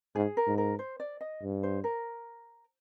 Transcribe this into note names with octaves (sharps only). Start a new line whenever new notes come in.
G#2 G#4
A#4
G#2
A#4
C5
D5
D#5
G2
C5
A#4